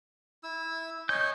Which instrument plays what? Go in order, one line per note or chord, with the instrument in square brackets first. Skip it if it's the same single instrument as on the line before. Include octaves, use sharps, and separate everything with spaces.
[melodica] E4 E6
[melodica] C#5 D#5 G#5 [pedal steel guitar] G6